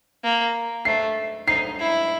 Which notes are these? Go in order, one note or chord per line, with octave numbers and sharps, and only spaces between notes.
A#3
A3 C7
D#4 C7
E4